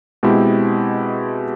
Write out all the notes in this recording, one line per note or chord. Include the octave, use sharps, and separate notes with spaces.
B2 G#3 C4 E4 G4